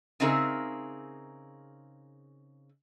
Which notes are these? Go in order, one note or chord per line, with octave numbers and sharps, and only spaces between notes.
C#3 C4 D#4 G#4 A#4 E5